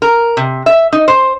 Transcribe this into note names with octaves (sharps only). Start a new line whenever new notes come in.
A#4
C3
E5
D#4
C5